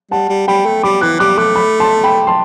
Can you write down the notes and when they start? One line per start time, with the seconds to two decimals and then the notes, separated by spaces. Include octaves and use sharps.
0.11 G3 F#5 A5
0.29 G3
0.48 G3 G5 B5
0.65 A3
0.83 G3 B5 D6
1.01 E3 D6 F#6
1.19 G3 D6 F#6
1.38 A3 D6 F#6
1.56 B5 D6
1.80 A5 C6
2.04 G5 B5
2.27 A5 C6